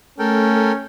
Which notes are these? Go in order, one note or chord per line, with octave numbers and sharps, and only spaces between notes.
A3 C#4 A4 A#4 G5